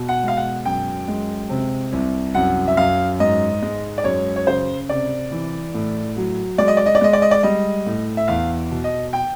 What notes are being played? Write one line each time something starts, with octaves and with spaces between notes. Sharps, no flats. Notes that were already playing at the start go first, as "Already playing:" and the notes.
Already playing: B2
F#5
G#3 F5
F#5
F#2 G5
G#3
C3
C2
F#2 F#5
E5
F#2 F5
G#2 D#5
G#3
D5
F#2 C#5
C#5
C#3 C5
C3 D5
E3
A2
F#3
G#3 D5
D#5
D5
D#5
D5
G#3 D#5
D5
D#5
D5
G3 D#5
A2
E5
E2 F5
B2
D#5
G5